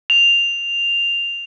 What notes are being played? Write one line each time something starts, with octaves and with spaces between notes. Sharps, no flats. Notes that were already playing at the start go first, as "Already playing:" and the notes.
F7